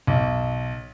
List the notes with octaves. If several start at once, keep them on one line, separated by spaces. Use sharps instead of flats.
B1